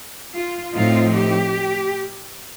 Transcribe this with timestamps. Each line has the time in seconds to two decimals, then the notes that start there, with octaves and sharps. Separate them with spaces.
0.34 F4
0.73 A2 F3 C4 D#4 F4
1.13 G4